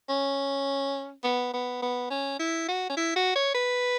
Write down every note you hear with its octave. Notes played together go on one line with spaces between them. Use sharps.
C#4
B3
B3
B3
C#4
E4
F#4
C#4
E4
F#4
C#5
B4